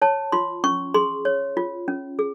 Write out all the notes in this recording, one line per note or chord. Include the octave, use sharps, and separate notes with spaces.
C#5 A5
F4 C6
C#4 C#6
G#4 C6
C#5
F4
C#4
G#4